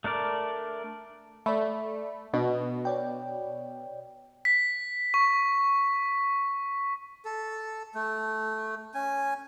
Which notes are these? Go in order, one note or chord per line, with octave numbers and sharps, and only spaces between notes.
A3 D4 A#4 D5
A3 D5 B5
B2 D4 B4 D#5
C#5 D5 G5
B6
C#6
A4
A3
C#4 G#5